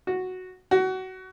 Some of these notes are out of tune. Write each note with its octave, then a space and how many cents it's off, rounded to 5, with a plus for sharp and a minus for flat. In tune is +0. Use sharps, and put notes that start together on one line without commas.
F#4 -5
F#4 +20